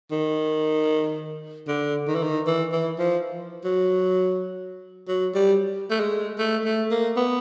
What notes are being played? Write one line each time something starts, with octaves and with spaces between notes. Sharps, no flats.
D#3
D3
D#3
E3
D#3
E3
E3
F3
F#3
F#3
G3
A3
G#3
A3
A3
A#3
B3